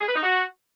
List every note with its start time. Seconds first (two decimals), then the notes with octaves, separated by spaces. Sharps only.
0.01 G#4
0.08 B4
0.16 D#4
0.23 F#4